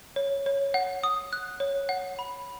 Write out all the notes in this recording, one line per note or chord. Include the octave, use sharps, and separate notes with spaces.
C#5
C#5
F#5
D#6
F#6
C#5
F#5
B5